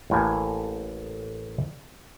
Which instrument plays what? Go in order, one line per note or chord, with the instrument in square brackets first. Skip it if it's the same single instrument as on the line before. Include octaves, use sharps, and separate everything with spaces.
[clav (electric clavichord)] A1 A2 A#3 G#5